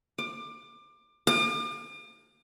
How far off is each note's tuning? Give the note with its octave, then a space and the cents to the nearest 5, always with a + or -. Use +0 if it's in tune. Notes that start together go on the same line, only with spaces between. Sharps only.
D6 +25
D6 +45